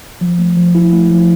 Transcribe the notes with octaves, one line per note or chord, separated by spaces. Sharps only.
F3
A3
F3
E4
A3
F3